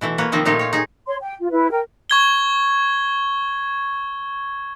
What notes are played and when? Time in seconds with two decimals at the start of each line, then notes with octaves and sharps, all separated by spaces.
0.01 B2 E3 A3
0.18 A#3 B4 C#5
0.32 C3 D#3 F3 C4 D#4
0.45 A#2 A3 D#4 F4 G4 C#5
0.59 F4 C#5
0.73 D#4 G#4
1.07 C#5 C6
1.21 G5
1.39 F4
1.51 E4 B4
1.71 A#4 G5
2.10 C#6 G#6 G7